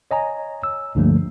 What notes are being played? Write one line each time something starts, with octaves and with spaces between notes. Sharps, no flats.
C#5 D#5 G#5 A#5
E6
C#2 G2 D3 F3 A3 A#3